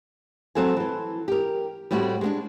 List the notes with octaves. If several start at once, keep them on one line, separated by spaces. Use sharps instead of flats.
F#3 C4 A4 F#5 G#5
E3 A4
G4 A#4
A2 G3 A3 C4 F#4
G#3 B3 D4